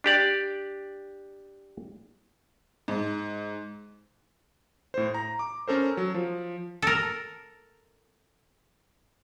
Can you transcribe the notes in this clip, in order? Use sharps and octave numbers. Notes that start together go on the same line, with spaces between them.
D4 G4 D5
G#2
A2 C5
A#5
D6
C#4 A4 A#4 C5
F#3
F3
A4 A#4